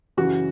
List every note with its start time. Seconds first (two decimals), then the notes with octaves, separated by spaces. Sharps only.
0.17 F#2 C#3 E3 F#4